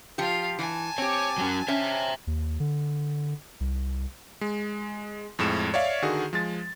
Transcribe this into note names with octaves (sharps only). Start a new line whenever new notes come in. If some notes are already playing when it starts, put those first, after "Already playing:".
F3 F4 G4 F5
E3 G#5 A5
C4 G4 C#5
F#3 C#4
C#4 C5 E5
D#2
D3
C2
G#3
F2 A2 G#3 E7
C#5 D5 E5 F5
D3 D#3 F#4 G#4
F3 G#3 A6